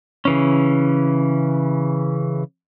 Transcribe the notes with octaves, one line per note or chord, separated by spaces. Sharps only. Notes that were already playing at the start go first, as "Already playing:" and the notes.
C#3 E3 C#4